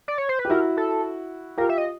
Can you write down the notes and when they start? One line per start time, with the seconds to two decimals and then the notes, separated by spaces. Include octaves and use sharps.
0.08 D5
0.18 C#5
0.29 C5
0.39 B4
0.45 G4
0.50 E4 F#4 A#4
0.77 A4
1.58 F4 G4 A#4
1.69 E5
1.78 D#5